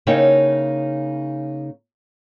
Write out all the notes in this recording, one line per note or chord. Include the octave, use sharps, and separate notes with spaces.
C#3 A#3 D#4 E4 C#5 G5